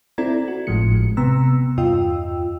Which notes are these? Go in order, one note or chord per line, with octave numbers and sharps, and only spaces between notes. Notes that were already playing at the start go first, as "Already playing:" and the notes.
C4 E4 A4 D5 A#5 G#6
F#4
G#1 A2 F3 G#3 C#7
C3 B3 A#5 E6
E2 G2 F4 D#5 G5 E6